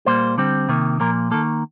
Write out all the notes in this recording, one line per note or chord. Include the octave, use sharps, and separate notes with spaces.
A#2 G3 A#3 C5
D3 G3 C4
C3 D#3 A#3
A#2 F3 A#3 A#4
D#3 A#3 A4